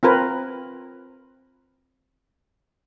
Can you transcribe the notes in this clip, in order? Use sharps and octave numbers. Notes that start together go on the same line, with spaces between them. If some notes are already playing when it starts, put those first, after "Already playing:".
C4 F4 A#4 B4